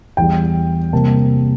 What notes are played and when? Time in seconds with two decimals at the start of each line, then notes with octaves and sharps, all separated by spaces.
0.17 E2 E3 G3 G5
0.93 C3 G3 A#3 A5